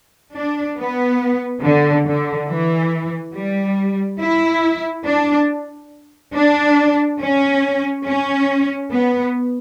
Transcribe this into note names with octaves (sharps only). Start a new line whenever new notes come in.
D4
B3
D3
D3
E3
G3
E4
D4
D4
C#4
C#4
B3